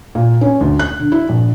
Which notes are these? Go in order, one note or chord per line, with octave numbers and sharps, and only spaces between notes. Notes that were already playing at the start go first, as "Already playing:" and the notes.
A#2
C#4
D2
F#6
D3
E4
A#1